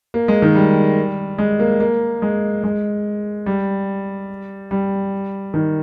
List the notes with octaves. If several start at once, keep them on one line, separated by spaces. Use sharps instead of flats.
A#3
G#3
D#3
G3
G#3
A#3
A#3
G#3
G#3
G3
G3
D#3